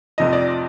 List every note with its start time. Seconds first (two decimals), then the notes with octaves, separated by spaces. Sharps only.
0.18 F1 F2 C3 F3 D#5
0.33 D5